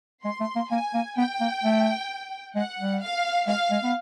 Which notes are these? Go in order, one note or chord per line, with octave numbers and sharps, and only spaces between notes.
G#3 C6
A3
A#3
A#3 G#5
A#3
B3 G5
A#3
A3
G#3 F#5
G3
F5
G#3 F5
G#3
B3